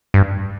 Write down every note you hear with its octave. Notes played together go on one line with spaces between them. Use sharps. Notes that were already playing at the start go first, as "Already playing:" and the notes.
G2